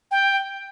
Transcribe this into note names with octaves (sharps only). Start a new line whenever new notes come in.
G5